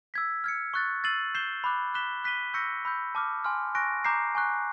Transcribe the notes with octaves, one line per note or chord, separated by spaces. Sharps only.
E6 G#6 B6
F6 G#6 C#7
C#6 F#6 A6
E6 A6 C7 D#7 F#7
G6 C7 E7 G7
B5 D6 F#6
D6 F#6 B6 E7 G7
F#6 B6 D#7 G7
C#6 E6 G6 A#6 C#7
B5 E6 G6
A5 D6 F6
G#5 C6 F6
G#5 C#6 F#6 A#6 D7
A#5 D6 G6 C7
G#5 C#6 F#6